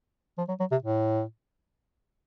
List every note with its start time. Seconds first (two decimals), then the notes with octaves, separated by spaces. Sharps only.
0.38 F3
0.48 F#3
0.60 F#3
0.71 C3
0.82 A2